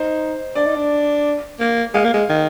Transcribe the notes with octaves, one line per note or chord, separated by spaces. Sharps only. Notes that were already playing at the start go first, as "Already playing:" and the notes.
Already playing: D#4 C5
D4 D5
D#4
D4
A#3
G#3 F5
A#3
G#3
D#3